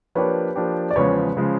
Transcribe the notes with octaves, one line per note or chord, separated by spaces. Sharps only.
F3 A#3 D4 G4 B4 C#5
F3 A#3 D4 G4
D5
E2 C#3 F3 G#3 B4 C#5
C#3 F3 G#3